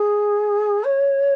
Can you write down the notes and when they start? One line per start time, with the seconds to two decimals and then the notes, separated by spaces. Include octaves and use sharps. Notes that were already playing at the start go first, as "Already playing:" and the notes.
Already playing: G#4
0.84 C#5